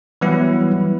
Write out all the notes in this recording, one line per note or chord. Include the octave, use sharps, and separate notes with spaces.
E3 F#3 G3 B3 E4 B4